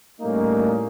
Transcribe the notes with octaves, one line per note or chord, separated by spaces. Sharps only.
A2 G3 A3 A#3 C#4 D#4